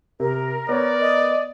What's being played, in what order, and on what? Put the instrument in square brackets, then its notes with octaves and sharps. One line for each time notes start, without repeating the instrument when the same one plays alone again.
[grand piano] C3 [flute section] A#4
[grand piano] B3 [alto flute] C#5 [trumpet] D5
[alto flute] D#5